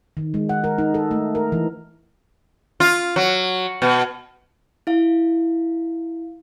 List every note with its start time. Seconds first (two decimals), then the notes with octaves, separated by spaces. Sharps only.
0.17 D#3
0.34 G#3
0.49 F#5
0.64 A#4
0.78 D#4
0.94 A4
1.11 A3
1.35 A#4
1.52 E3
2.80 F4
3.16 F#3
3.82 B2
4.87 E4 F5